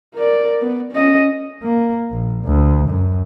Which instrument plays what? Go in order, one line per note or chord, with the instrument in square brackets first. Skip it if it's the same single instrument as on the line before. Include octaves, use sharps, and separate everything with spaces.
[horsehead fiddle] A#4 D5
B3
C#4 D#5
[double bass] A#3
A#1
D2
F#2